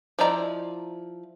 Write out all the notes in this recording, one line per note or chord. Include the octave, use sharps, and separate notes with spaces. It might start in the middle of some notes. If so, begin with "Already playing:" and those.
F3 E4 D5 D#5 A#5